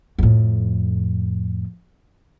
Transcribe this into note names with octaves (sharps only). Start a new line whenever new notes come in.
F2 A2